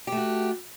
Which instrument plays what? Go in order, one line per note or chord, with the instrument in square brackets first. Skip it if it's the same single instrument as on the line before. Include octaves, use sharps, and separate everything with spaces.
[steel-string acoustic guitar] G4
A3
F#4